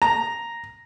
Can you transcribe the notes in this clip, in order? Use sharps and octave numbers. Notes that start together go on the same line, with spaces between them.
A#5